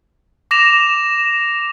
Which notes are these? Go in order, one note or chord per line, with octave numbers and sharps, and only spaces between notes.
D6 A#6 E7 F7